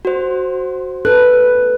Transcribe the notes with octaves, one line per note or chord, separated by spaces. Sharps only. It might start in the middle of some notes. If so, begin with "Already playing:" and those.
F#4 C5
A4 B4 F#6